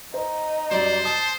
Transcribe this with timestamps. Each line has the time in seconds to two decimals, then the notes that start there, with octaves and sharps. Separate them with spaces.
0.14 D#4 C5
0.71 F#2 F#3 G3 C5 D5
1.05 A5 D#6